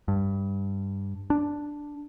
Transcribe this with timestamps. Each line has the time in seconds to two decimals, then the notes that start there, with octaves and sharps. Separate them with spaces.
0.08 G2
1.30 D4